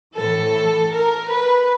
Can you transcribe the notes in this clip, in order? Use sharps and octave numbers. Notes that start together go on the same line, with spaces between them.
A2 E3 A4
A#4
B4